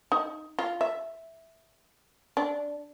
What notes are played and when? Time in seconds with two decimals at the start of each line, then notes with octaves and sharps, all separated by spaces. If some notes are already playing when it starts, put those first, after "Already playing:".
0.12 D#4
0.59 F4
0.81 E5
2.37 D4